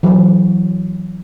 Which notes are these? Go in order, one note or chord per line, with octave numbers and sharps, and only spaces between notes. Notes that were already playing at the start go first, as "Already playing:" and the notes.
E3 F#3